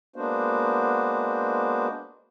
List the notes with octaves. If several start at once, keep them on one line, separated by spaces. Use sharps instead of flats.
G#3 A#3 B3 D4 F#4 C5